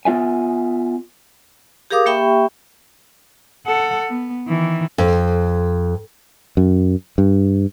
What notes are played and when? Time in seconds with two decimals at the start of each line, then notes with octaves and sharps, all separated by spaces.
0.05 B3 F4 E5 G#5
1.90 G4 G#4 A#4 F5 D6 D#6
2.06 A#3 G4 E5 G5 B5 C#6
3.66 A4 F#5
4.09 B3
4.48 D#3 E3
4.98 F2
6.57 F#2
7.18 G2